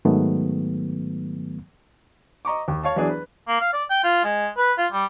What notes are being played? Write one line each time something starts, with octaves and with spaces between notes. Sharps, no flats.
G#2 D#3 F#3 A3 B3
D#5 A#5 C#6 D6
D#2
C#5 F5 A5
E3 F#3 B3 D4 G#4
B4
A#3
F5
D5
G5
F4
G#3
B4
F4
G3